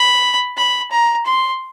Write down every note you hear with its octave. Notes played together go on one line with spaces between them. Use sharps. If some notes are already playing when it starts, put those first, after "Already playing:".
Already playing: B5
B5
A#5
C6